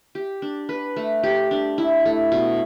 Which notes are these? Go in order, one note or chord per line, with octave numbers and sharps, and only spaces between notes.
G4
D4
B4
A3
G4
D4
E4
A3
B2